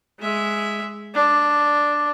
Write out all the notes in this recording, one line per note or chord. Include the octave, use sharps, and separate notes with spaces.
G#3 E5
D4